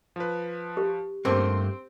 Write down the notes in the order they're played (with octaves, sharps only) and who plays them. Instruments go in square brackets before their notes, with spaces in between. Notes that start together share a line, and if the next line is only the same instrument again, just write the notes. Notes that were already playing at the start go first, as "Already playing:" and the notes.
[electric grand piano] F3 B4
[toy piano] G4
[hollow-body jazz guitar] G2 A3 A#3 [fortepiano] C4 [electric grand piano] C6